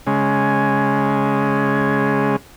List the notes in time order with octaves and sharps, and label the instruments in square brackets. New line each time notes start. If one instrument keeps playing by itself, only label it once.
[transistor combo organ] C#3 G#3